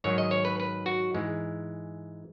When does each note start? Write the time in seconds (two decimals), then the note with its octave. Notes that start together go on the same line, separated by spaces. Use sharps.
0.04 G#2 D#3 F#3 C#5
0.18 D#5
0.31 C#5
0.45 B4
0.60 B4
0.86 F#4
1.15 G#2 E3 G#3